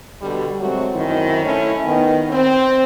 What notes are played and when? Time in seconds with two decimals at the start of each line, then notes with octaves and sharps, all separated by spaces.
0.21 B2 D3 G3
0.60 F#3 G#3 A3 C4 F#4
0.92 F#2 D#3 C4 E4
1.44 A3 C#4 E4
1.85 D#3 B3
2.30 C4